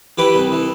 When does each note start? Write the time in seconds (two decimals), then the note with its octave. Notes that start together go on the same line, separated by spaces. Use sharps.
0.18 E3 G4 B4
0.35 C2
0.52 E3